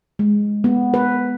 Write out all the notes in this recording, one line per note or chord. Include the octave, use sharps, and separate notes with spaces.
G#3
B3
B4